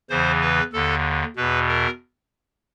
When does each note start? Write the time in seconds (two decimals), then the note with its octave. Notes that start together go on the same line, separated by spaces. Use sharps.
0.09 E2 C#3 E3 C5
0.41 B4
0.73 D#2 D3 A4
1.36 E2 B2 B4
1.68 A#4